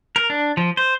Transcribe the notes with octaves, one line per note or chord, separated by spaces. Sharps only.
A#4
D4
F3
C5